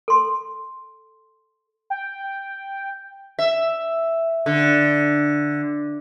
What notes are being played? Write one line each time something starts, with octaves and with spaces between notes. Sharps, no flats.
A4 C6
G5
E5
D3